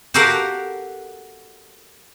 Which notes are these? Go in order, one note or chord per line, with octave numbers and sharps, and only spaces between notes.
F#4 G4 A4 A#4 F5 F#5